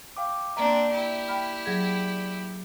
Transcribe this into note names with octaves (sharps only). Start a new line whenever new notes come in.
F5 G5 D6
A#3 C4 D4 D5 E5 A#5
E4 G4
G5 B5 F6
F#3 G#4 G#6